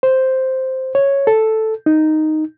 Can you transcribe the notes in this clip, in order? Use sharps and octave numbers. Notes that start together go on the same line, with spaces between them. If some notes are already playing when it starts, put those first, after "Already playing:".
C5
C#5
A4
D#4